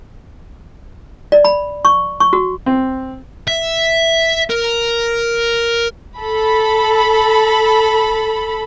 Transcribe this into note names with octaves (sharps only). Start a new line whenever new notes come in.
D5
B5
C#6
C#6
F#4
C4
E5
A#4
A4 B5